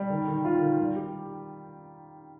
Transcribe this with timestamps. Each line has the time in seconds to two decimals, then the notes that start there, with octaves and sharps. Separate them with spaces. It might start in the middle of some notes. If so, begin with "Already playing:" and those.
Already playing: G3
0.10 D#3
0.28 D#3
0.45 F4
0.62 D#3
0.79 G3
0.96 G4